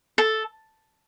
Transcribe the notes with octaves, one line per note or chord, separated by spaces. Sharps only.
A4